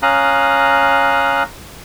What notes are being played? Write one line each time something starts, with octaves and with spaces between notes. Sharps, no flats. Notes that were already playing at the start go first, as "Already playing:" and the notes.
C#4 F5 A#5 D#6 F#6